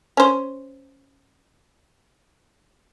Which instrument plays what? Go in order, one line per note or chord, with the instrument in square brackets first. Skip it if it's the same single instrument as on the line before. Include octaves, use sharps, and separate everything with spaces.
[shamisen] C#4 C5